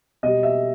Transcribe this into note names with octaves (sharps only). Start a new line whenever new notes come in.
B2 G3 D#5
E5